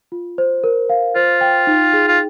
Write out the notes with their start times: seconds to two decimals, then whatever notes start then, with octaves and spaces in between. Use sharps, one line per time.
0.12 F4
0.38 C5
0.64 A#4
0.90 F5
1.16 F4 C5
1.41 G5
1.67 D#4
1.93 G#4
2.08 F4